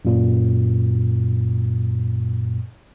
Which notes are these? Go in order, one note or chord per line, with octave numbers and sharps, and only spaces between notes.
F#2 A#2